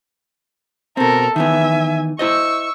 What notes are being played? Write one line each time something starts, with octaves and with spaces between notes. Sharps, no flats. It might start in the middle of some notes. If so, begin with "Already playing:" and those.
B2 C4 A4 A#4
D#3 E3 B3 E5 G#5
E4 C5 D#5 C#6 E6